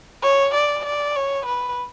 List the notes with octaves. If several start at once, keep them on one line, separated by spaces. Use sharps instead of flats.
C#5
D5
D5
C#5
B4